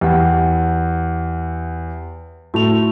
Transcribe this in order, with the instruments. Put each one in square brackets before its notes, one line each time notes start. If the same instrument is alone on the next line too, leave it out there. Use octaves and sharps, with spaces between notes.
[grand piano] E2 [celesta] G4 F#5 G5
[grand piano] A2 A3 [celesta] F#4 F7